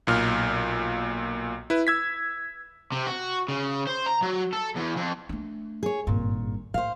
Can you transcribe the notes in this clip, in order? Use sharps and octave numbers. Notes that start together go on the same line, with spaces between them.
B1 A#2 F6
E4 B4
E6 G#6 B6
C3
F#4
C#3
C5
A#5
F#3
A4
E2
F2
A3 D4
G#4 C#5
G#1 G2 A#2
A2 C5 F5